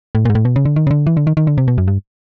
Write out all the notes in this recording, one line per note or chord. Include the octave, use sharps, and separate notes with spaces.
A2
A#2
G#2
A2
B2
C#3
D3
D#3
C#3
D3
E3
D3
D#3
D#3
D3
C3
B2
F#2
G2